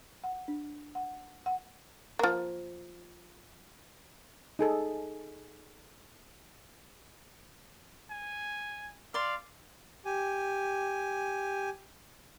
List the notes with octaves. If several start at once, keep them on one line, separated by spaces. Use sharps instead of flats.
F#5
D4
F#5
F#5
F3 A#3
D#4 G#4 A4
G#5
D5 F5 C6
G4 G#5